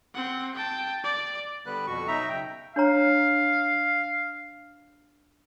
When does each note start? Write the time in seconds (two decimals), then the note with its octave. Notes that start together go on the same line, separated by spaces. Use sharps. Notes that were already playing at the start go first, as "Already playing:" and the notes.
0.15 C4 F#5
0.55 G5 A5
1.04 D5
1.66 D3 G3 B3 B4 F#6
1.87 F2 B2 F#4 C#6
2.08 B2 F#3 D#4 E5 A#5
2.29 C#3 G5
2.76 D4 C#5 F5 A#5